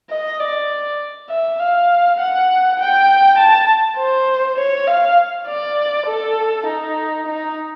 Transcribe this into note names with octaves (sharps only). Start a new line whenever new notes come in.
D#5
D5
E5
F5
F#5
G5
A5
C5
C#5
F5
D5
A4
D#4
D#4